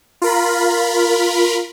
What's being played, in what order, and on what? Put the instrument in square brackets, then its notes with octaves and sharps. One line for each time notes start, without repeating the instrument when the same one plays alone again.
[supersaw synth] F4 A#4 B5